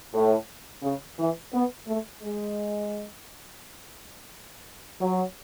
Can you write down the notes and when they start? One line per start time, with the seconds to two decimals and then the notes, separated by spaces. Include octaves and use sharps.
0.14 A2
0.83 C#3
1.18 E3
1.53 B3
1.87 A3
2.22 G#3
5.00 F#3